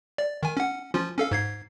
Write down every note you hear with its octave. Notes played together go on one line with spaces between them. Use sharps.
D5
D#3 G#5
C#4 F#5
F3 C#4 F4
C#4 A4 F5
G#2 G#6 C7